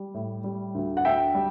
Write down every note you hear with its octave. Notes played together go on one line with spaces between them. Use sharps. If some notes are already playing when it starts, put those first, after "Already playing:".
Already playing: G3
A2
G3
D2
F#5
D2 E5 G5
G3